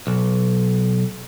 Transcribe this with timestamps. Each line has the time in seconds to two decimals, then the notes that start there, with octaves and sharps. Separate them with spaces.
0.07 B1